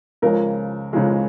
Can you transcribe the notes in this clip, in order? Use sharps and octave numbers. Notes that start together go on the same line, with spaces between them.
C#2 C#3 F3 G#3 A#4
C#2 C#3 F3 G#3